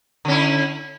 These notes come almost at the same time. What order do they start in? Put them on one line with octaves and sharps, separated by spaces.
D3 C#4 E4